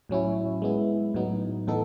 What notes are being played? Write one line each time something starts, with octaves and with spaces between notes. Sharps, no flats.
A2 F#3 C#4 E4
G#3 B3 E4
A2 F#3 B3 D#4
A2 E3 B3 D#4 A4